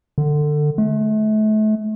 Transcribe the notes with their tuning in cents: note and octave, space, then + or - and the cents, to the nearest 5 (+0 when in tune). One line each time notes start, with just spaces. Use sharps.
D3 +25
A3 -35